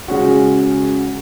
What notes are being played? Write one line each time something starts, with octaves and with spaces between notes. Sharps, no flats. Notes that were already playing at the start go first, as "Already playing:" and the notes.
C#3 G#3 C#4 F#4